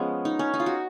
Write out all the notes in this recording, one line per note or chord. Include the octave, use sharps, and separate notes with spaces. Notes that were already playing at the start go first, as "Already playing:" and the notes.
Already playing: F3 G#3 B3 C#4
D#4
C#4
D#4
F4
F#4